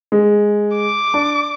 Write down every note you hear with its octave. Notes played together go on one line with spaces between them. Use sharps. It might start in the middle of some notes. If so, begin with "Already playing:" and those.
G#3
D6
D4